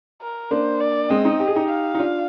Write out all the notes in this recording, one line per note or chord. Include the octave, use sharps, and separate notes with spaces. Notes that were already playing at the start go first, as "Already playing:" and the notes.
A#4
A#3 D4 C5
D5
G#3 C4 D#5
C4 D#4
G4
G#4
D#4 G4
F5
D#4
D4 F4